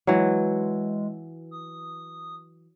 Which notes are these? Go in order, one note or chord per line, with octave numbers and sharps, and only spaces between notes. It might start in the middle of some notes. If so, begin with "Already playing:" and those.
E3 F#3 G#3
D#6